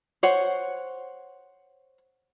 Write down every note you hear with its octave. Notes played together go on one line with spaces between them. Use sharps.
C5 C#5 F#5